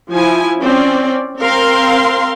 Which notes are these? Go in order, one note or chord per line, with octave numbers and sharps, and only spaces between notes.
F3 E4 G#5
C4 C#4 D5
C4 A#4 F5 C6